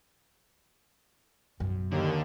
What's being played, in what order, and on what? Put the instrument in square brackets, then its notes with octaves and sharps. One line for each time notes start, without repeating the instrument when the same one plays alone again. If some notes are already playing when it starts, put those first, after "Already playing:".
[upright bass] F#2 B2
[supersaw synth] D#2 [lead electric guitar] D3